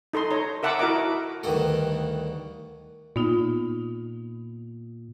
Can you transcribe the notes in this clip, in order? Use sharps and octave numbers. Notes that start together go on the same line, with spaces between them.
D#4 A4 D#5 C6
C#5 A#5
A#4 E5 F#5 A5 D6 E6
E4 F#4 A#4 D#5 F#5 D6
D2 G2 D#3 F#4 A4
A#2 B3 D#4 F4